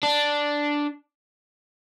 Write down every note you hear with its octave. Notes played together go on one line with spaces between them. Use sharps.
D4